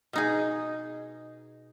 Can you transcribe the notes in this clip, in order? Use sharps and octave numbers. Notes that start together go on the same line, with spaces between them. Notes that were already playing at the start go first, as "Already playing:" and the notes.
B2 D#4 G#4